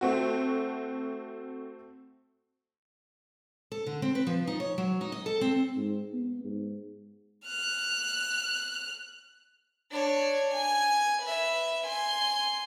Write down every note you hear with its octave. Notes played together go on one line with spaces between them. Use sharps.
A3 C4 F#4
A4
D3
C4
B4
F3
D#4
C#5
F#3
D#4
D#5
A4
C4
G#2
B3
G#2
F6 F#6
D4 C#5
G#5
B4 E5
G#5 C6